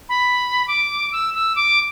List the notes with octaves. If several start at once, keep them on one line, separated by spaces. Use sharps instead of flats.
B5
D6
E6
E6
D6